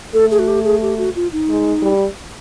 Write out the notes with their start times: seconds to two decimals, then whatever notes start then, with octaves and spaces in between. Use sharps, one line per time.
0.13 A3 A4
0.31 G#4
0.39 F#4
0.48 G4
0.64 G#4
0.82 G4
0.98 F#4
1.16 F4
1.33 D#4
1.49 G#3
1.82 G3